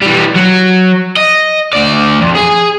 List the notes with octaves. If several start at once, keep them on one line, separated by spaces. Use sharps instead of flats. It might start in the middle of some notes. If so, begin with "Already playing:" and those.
E3 G3
F#3
D#5
D2 D5
F2
G#4 G#5